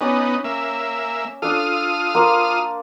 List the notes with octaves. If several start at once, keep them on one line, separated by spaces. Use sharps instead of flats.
B3 C#4 D#4 D5
A#3 E5
D4 F4 A4 D#6 F6
A#3 C5 D5